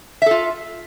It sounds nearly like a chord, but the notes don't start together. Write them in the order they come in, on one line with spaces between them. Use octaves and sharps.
E5 A4 F4